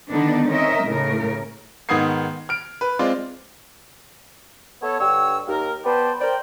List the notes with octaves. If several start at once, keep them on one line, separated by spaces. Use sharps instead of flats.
D3 D#3 B3 D4 D#4
C4 C#4 D#4 A#4 D#5 E5
A2 C#3 A#4
G#2 D#3 B3 D#6 G#6 C7
F6 D7
B4
G#3 C4 F4 D5
B3 A4 C#5
G2 D3 G4 C#5 E6
D#2 A#4
B3 G4 B4 C5 D5 A5
A#4 C5 D5 G5